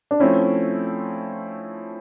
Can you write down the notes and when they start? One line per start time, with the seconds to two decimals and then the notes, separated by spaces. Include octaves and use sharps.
0.11 D4
0.20 F3 A3 C4 C#4 E4